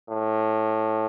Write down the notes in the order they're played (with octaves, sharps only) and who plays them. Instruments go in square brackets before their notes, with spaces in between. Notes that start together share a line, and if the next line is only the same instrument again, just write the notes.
[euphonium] A2